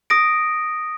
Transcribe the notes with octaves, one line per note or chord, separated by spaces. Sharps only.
D#6 A#6 D7